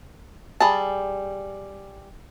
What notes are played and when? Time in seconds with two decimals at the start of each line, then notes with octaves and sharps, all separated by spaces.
0.60 G3 G#4 A5